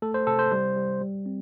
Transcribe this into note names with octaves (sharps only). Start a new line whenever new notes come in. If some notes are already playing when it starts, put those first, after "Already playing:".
A3 A4
C5
C3 A4
C5
G3 C5
G3
G3
C4